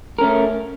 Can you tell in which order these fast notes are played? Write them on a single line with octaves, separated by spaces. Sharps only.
A#4 C#4 A3